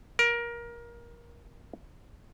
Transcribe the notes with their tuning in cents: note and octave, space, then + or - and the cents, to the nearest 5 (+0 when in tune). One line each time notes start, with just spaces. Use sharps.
A#4 +20